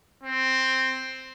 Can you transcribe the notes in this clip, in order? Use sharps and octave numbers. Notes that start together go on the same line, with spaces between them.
C4